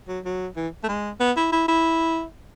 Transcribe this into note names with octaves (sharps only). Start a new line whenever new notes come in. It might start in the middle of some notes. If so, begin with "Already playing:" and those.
F#3
F#3
E3
A3
G#3
B3
E4
E4
E4